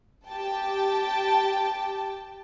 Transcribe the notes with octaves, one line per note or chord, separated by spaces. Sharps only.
G4 G5 A5